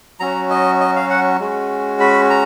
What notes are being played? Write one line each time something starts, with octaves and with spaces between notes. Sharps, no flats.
F#3 C#4 F#4 A#5
D#5
D#5
F5
F#5
G#3 C#4 F#4
B5
A#5